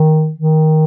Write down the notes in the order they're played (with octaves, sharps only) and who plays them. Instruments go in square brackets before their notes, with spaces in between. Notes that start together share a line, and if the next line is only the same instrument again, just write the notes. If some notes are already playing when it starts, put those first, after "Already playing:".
Already playing: [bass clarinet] D#3
D#3